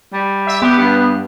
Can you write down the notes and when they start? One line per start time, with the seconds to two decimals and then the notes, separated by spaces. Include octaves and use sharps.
0.13 G3
0.47 E5
0.62 B3 G4
0.78 G2